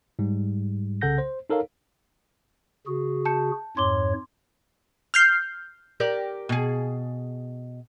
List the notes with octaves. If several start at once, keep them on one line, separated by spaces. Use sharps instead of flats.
G#2 G3
C2 C#3 A4 F#5 G6 A#6
C5
D#4 A4 A#4 C#5 F5
C#3 F#4 G#4
A5 G6 C#7
F2 G#2 C#5 C6 D6 G7
F6 G6 C7
G4 A#4 D5
B2 G#4